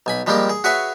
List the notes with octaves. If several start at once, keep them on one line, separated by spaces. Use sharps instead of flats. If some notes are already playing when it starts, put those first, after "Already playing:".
B1 G#5 B5
F3 G3 G#3 A#3 C4 F4
G#4
F#4 G#4 B4 C#5 E5 G#5